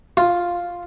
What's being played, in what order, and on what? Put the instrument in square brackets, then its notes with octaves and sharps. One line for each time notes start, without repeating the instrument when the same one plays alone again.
[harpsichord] F4